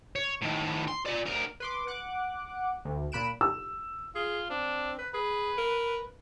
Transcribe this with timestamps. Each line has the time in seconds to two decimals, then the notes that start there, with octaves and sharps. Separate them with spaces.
0.16 C#5
0.42 A2 D#3
0.88 C6
1.06 F4 D5
1.26 D2 A#4
1.60 B4 C6 D6
1.87 F#5 D6 F#6
2.85 D2
3.12 A#2 A#3 B5 F#6 D7 E7
3.41 E6
4.15 F4 G#4
4.50 C4 D4
4.98 B4
5.14 G#4 B4
5.58 A#4